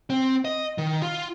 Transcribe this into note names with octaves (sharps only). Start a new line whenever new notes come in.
C4
D#5
D#3
F4